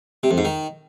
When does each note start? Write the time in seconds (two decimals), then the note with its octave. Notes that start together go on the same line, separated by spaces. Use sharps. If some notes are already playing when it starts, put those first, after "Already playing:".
0.23 C3
0.31 F2
0.38 G#2
0.45 D#3